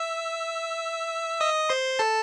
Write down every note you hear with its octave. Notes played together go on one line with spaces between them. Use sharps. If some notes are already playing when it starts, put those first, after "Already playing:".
Already playing: E5 E6
D#5 D#6
C5 C6
A4 A5